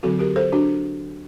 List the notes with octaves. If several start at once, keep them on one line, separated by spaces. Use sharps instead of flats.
D3 F#3 C4 F#4 A4
G4 A#4
A4 C5
D4 F#4